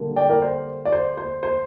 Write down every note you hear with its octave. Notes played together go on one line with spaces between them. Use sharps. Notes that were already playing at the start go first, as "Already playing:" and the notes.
Already playing: D3 G3 A#3
D5 G5
A#4 D5
C5
D5
C5
C5
C5